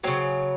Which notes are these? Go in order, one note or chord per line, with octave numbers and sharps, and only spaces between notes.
C#3 F#3 C4